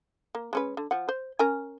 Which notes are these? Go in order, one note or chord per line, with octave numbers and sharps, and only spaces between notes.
A#3
G#3 C#4 B4
D3
F3 F#5
C5
C#4 A#4 G#5